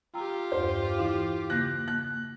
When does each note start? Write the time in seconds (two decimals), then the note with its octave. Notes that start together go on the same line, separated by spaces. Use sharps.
0.14 F4 G4 G5 A#5 E6
0.52 E2 G2 C5
0.98 E3 E4 F5
1.50 C#3 A#3 F#6 G6 A#6
1.88 A#3 F#6